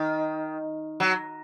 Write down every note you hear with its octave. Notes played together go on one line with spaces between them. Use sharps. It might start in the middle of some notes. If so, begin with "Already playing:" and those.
Already playing: D#3
F#3